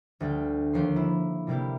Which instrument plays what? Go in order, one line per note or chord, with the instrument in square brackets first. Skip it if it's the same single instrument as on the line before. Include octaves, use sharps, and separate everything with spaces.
[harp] D2 G3 G5
D#2 F3 C6
E4
C3 G3 A#3 E4 G4